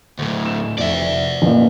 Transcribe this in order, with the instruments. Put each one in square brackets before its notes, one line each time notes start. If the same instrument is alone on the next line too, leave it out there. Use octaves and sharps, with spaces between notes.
[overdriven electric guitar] D2 A2
[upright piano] E7
[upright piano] F1 [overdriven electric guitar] D5 E5
[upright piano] A1 A#2